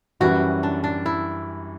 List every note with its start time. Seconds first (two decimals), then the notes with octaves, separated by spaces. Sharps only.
0.20 F#2 E3 G3 C#4 F#4
0.63 D4
0.84 D4
1.06 E4